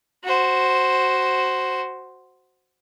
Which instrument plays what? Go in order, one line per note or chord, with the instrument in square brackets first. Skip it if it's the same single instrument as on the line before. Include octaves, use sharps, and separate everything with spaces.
[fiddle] F#4 C5